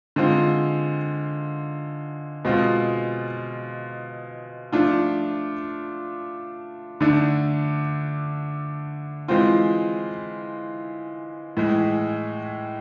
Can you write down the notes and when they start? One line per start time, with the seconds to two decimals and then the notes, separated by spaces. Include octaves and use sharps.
0.16 D3 G#3 C4 F4
2.45 B2 G#3 C4 F4
4.73 F3 A3 D4 F4
7.01 D3 A3 D4
9.28 E3 G#3 C4 F4
11.57 A2 E3 G#3